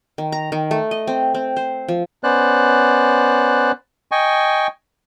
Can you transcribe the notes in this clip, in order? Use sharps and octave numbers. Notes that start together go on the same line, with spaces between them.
D#3
A#5
D#3
A3
D#5
C4
C4
C5
F3
B3 C#4 C5 D5 F#6
D#5 G5 G#5 C#6